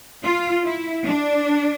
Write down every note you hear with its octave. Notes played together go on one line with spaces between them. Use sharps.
F4
E4
D4